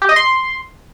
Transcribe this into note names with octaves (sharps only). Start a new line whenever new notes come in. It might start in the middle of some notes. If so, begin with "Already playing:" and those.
G4
D#5
C6